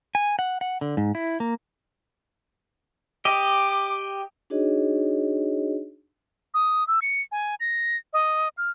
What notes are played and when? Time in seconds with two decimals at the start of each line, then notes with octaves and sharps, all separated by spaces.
0.15 G#5
0.39 F#5
0.61 F#5
0.81 D3
0.97 G#2
1.15 E4
1.40 A#3
3.25 G4 D#5 D6
4.50 D4 D#4 F#4 G#4 C#5 D#5
6.54 D#6
6.88 E6
7.02 C#7
7.32 G#5
7.60 A#6
8.13 D#5
8.58 F6